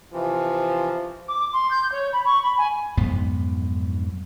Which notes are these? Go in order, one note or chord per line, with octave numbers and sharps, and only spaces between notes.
C3 E3 F3
D6
C6
G6
C#5
B5
C#6
B5
G#5
B1 F2 G#2 B3